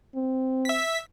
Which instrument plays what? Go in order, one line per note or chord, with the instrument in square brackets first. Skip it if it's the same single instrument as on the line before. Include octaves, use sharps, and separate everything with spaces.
[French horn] C4
[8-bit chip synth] E5 B6